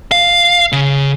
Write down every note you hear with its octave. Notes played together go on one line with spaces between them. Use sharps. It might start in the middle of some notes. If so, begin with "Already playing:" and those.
F5
C#3